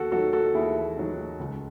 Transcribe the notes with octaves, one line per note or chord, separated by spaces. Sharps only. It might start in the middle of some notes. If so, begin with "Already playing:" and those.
Already playing: D#2 F#4 A4
D#3 F#3 F#4 A4
F#4 A4
D#2 E4 G#4
D#3 F#3
C#2